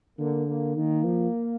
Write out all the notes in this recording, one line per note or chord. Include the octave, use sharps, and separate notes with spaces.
D3 A#3
A#3
D#3 A#3
F3